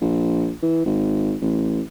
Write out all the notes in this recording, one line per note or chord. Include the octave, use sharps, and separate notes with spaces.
A#1
E3
G#1
A1